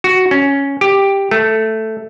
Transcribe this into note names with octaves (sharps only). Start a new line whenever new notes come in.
F#4
C#4
G4
A3